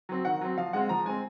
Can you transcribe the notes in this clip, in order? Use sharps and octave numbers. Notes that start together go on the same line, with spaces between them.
F#3 C4
D#3 F#5
F#3 C4
F3 F5
G#3 C4 F#5
F3 A#5
G#3 C4 G#5